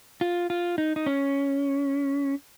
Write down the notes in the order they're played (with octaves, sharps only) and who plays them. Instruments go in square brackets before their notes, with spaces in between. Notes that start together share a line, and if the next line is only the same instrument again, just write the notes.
[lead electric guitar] F4
F4
D#4
D#4
C#4